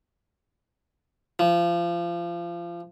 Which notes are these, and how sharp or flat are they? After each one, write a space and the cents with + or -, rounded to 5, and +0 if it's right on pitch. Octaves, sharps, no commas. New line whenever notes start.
F3 -25